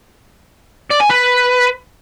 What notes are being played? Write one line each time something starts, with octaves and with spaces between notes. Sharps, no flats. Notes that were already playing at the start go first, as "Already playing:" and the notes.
D5
G#5
B4